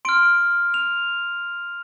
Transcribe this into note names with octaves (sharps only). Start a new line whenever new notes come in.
C6 F6 D7
F7